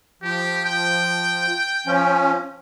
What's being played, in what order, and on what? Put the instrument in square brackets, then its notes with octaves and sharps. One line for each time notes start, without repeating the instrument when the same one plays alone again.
[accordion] F3 [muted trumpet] G4
[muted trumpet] G5
[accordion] F3 C#4